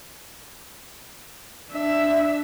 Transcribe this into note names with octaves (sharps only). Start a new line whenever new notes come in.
D4 E5